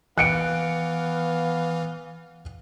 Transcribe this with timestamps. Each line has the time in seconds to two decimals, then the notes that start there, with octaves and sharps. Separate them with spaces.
0.18 E3 B3 F5 F#6 C#7 D7